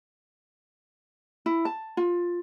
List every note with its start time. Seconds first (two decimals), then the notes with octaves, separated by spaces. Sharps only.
1.46 E4
1.65 A5
1.97 F4